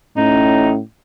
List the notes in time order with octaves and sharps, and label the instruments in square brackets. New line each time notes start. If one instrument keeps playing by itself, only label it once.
[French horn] A2 [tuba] C#4 [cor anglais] D#4